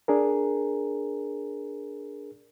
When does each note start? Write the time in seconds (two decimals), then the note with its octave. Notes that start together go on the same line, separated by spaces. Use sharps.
0.08 D4 G#4 A#4